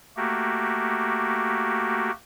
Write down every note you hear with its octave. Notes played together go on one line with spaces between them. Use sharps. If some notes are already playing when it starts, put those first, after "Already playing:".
A3 A#3 F#4 G4